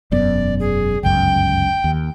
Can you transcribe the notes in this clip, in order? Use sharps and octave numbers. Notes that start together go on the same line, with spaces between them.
E1 F#2 B3 D5
G#4
G1 C#2 F#2 G5
D#2